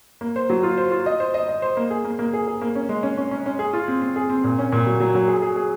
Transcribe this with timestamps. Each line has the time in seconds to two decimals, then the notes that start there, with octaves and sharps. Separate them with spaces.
0.21 A#3
0.36 C5
0.50 F#3
0.63 F4
0.78 C5
0.92 F4
1.06 D#5
1.20 C5
1.34 D#5
1.48 D#5
1.62 C5
1.77 A#3
1.90 G#4
2.04 A#3
2.19 A#3
2.33 G#4
2.47 G#4
2.62 A#3
2.75 C#4
2.89 G#3
3.03 C#4
3.18 C#4
3.31 C#4
3.46 C#4
3.59 G#4
3.73 F4
3.88 C4
4.02 C4
4.16 G#4
4.29 C4
4.44 A#2
4.58 C#4
4.72 A#2
4.87 F#3
5.00 F#3
5.15 F#3
5.28 G#4
5.42 G#4
5.56 G#4